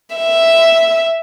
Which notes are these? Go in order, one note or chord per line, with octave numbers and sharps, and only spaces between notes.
E5